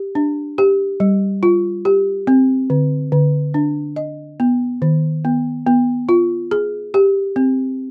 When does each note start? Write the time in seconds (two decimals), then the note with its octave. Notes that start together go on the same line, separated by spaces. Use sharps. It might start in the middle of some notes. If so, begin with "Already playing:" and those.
Already playing: G4
0.15 D4
0.58 G4
1.00 G3
1.43 F4
1.85 G4
2.27 C4
2.70 D3
3.12 D3
3.54 D4
3.96 D#5
4.40 B3
4.82 D#3
5.25 B3
5.67 B3
6.09 F4
6.51 G#4
6.94 G4
7.36 C4